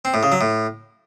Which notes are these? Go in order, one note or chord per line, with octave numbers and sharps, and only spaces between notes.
C4
A2
C#3
F#3
A2